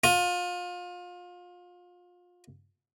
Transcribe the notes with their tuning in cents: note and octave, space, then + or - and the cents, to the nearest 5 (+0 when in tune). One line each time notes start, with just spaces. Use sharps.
F4 +30